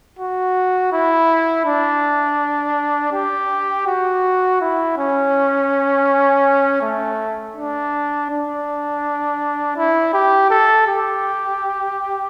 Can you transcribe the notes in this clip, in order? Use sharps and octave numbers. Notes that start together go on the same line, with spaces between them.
F#4
E4
D4
G4
F#4
E4
C#4
A3
D4
D4
E4
G4
A4
G4